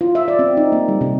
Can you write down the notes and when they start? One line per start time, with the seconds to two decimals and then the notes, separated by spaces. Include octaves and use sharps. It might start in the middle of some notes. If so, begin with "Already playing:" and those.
0.01 F4
0.15 E5
0.28 D5
0.39 C4
0.57 D#4
0.72 A#3
0.88 G3
1.01 C3